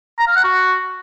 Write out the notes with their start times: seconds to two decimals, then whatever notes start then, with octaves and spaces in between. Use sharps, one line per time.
0.19 A#5
0.28 F5
0.36 F#5
0.44 F#4